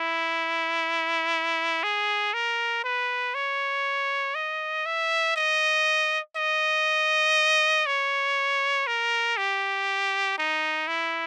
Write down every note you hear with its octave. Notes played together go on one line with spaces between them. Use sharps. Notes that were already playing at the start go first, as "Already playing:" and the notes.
Already playing: E4
G#4
A#4
B4
C#5
D#5
E5
D#5
D#5
C#5
A#4
G4
D#4
E4